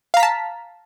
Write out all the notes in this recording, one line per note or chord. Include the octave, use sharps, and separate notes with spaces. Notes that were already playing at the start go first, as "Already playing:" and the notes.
F5 A5 A#5 B6